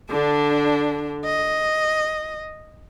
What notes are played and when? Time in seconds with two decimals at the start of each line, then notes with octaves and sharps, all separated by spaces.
0.10 D3 D4
1.25 D#5